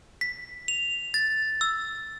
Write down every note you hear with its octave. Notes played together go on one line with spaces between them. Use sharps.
B6
F7
A6
E6